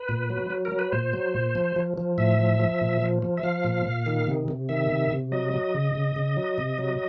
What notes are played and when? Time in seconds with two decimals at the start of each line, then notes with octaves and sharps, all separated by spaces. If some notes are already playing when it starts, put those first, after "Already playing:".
Already playing: B4
0.09 A#2
0.30 F#3
0.50 F#3
0.65 A#4
0.72 F#3
0.79 B4
0.92 A#2 C5
1.13 F#3
1.34 A#2
1.55 F3
1.76 F3
1.98 F3
2.18 A2 E5
2.39 F3
2.59 F3
2.81 A#2
3.02 F3
3.22 F3
3.38 E5
3.43 F3 F5
3.64 A#2
3.86 A#2
4.06 D#3
4.27 C3
4.48 C3
4.69 D#3 E5
4.90 C3
5.11 C3
5.32 F#3 D#5
5.53 F#3
5.74 C#3
5.95 C#3
6.16 C#3
6.37 F#3
6.58 C3
6.78 F#3